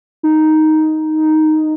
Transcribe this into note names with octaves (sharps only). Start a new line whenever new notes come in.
D#4